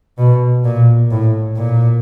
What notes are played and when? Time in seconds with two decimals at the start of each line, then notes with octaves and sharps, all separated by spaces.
0.18 B2
0.64 A#2
1.11 A2
1.57 A#2